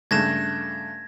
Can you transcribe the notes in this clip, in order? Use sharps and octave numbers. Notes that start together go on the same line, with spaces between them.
G2 C#3 A3 G#6 A#6 E7